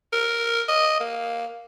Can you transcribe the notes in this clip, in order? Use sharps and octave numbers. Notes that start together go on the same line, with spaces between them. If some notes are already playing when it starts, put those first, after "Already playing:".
A#4
D#5
A#3